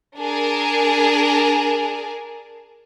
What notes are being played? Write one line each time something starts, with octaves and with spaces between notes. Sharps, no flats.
D4 G#4 A#4 G#5